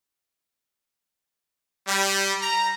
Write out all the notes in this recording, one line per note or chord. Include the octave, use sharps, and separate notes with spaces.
G3
A#5